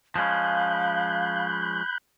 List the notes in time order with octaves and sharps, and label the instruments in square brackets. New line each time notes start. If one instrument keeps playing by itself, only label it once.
[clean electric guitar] F3 G#3 C#4 [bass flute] F5 [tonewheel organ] B5 F#6 G6